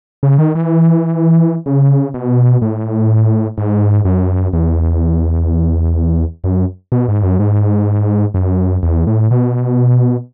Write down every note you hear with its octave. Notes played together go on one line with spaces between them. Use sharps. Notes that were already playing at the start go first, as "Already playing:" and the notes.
C#3
D#3
E3
C#3
B2
A2
G#2
F#2
E2
F#2
B2
G#2
F#2
G#2
F#2
E2
A2
B2